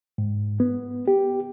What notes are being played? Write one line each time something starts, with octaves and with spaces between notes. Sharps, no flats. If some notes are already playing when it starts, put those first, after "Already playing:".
G#2
B3
G4